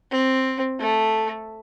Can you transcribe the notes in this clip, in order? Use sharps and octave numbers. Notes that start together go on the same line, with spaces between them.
C4
A3